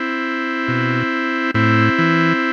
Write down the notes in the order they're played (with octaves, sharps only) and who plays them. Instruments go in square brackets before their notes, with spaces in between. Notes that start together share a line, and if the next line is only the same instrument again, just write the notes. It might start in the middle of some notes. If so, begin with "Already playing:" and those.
Already playing: [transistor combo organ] C4 E4
B2
A2 C4 E4
E3